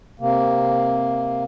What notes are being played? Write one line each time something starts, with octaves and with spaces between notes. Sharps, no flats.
C3 A#3